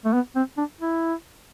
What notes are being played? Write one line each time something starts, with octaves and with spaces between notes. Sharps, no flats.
A3
B3
C4
D4
E4